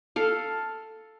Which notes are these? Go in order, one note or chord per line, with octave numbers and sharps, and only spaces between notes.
A4 F5